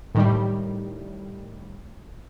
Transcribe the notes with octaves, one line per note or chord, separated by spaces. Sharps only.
A2 D#3 G3